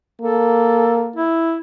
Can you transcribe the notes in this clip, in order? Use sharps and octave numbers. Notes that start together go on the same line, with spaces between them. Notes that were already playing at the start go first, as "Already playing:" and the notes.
A#3 A4
E4